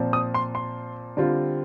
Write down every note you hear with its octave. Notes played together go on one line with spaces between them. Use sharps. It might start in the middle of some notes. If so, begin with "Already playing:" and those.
Already playing: A#2 F3 C4
D#6
C6
C6
D3 G3 C4 F4